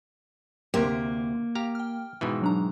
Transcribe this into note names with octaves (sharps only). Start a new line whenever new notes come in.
D2 C3 A#3 G4
G4 F5 A#5
G5 F6
G#2 B2 E3
F#3 D4 A#5